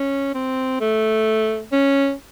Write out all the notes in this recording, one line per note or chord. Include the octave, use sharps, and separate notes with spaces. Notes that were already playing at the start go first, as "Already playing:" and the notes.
Already playing: C#4
C4
A3
C#4